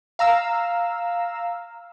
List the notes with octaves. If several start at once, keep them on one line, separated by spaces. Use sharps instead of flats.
F5 A#5 E6